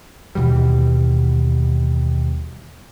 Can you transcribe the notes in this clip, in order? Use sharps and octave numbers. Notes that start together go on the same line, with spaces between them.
D#2 B2 E3 G3